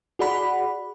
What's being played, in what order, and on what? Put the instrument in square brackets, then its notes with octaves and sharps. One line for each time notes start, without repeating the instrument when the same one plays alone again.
[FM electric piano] F#4 G#4 D5 F#5 B5